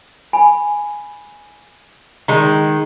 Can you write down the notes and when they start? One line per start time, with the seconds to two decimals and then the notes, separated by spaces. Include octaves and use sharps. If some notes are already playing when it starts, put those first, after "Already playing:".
0.33 G#5 B5
2.28 D#3 G#3 A#5